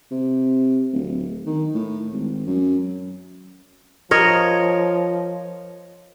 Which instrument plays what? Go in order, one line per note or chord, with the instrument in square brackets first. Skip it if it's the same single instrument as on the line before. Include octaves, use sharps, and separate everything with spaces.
[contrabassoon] C3
D1
D#3
A2
G#1
F#2
[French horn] F3 [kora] A#4 C#5 D#5